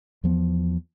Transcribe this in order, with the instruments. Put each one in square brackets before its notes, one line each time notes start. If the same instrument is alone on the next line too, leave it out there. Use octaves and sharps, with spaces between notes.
[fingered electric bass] E2 F3 B3